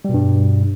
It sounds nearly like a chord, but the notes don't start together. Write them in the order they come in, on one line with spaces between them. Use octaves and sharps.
G3 B2 G2